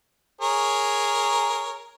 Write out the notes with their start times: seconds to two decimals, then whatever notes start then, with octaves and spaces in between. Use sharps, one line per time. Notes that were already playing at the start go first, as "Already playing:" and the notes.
0.41 G#4 A#4 C#5